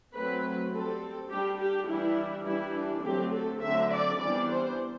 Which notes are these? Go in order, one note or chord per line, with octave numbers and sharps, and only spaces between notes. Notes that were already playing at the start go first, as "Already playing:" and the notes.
F#3 A3 C4 B4
G3 C4 A4
G3 D4 G4
G4
E3 G3 D4 E4
E3 G3 D4 E4
D4
D3 F#3 A3 C4 G4
A4
D3 F#3 A3 C4 E5
D5
E3 G3 B3 D4 D5
C5